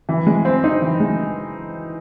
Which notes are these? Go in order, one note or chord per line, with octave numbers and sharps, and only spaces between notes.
E3
G#3
C4
D#4
E3
G#3